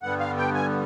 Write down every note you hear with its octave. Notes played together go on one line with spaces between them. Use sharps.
G2 D3 G3 B3 F#5
F5
G5
G#5